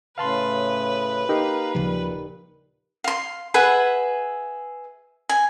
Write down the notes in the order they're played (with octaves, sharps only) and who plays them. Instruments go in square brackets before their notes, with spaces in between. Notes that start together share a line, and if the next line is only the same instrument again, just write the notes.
[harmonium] A2 C#3 [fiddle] B4 [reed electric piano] F5 A5 C6
[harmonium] A#3 F5 A#5 [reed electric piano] D#4 G4 A#4
[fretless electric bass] D#1 C#3 F3 [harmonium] A#2
[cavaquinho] F5 C6
G#4 B4 E5 F#5
G#5